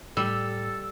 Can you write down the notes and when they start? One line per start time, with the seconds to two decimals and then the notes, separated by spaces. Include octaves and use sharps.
0.17 A2 G3 A4 E6